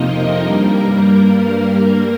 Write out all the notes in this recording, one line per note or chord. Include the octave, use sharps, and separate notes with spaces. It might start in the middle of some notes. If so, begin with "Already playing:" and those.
Already playing: F2 C3 F3 A#3 D#4 D#5
A#4
G2 G3 A#3